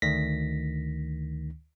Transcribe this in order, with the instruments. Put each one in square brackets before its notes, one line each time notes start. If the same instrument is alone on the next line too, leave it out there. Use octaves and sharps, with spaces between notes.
[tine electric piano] D2 D#3 A#6 B6